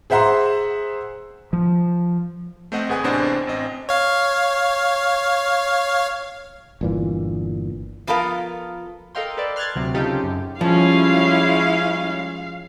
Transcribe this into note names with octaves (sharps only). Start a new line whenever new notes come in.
G#4 C5 E5 F#5 A#5 C6
F3
A3 C4 C5 D#5 F#5
G#1 G#4 B4 F#5 G#5
A1 A2 C3 B3 D4 C5
A1 C4 D#5
C#5 F5
G1 A#2 E3
F3 B3 F4 A4 A#4 F5
A4 A#4 D#5 F5 G5 C6
A4 B4 D5
C6 F6 F#6 G#6 A6
D2 C3 F#3 C4
C#3 C#4 D#4 F4 G4 A4
F#2
F3 G3 G#3 C#4 E4 F5